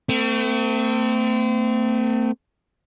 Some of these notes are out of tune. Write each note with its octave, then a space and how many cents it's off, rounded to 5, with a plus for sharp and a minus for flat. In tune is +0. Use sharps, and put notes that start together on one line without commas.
A3 +35 C4 -30